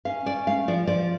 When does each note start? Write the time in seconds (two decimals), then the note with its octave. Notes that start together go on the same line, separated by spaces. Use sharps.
0.05 C#4 F5
0.26 C#4 D5
0.47 A3 F5
0.68 F3 D5
0.87 F3 D5